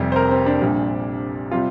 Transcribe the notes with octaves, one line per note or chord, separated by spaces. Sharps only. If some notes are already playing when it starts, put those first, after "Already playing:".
Already playing: F1 F2 C3 G3
C5
A#4
C4
D4
A#1 A#2 G3
C3 G3 F4